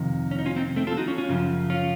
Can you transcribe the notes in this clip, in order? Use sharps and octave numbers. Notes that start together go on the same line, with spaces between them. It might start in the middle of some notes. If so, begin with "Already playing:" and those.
Already playing: F2 C3 D#3
C#4
D#4
C#4 F4
C4 D#4
A3 C4
F4 A4
D#4 F#4
C#4 F4
C#4 F4
F#2 C#3 F3
C#4 F4